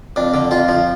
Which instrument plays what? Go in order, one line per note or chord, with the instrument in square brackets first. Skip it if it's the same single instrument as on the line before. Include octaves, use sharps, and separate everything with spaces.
[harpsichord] F2 D4
D3
F2 F4
F3